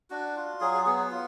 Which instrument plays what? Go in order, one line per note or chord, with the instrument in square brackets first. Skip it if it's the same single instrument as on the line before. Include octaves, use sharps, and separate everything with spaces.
[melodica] D4 F#4
F4
F#3 G#4
G#4
B3 G#4
F4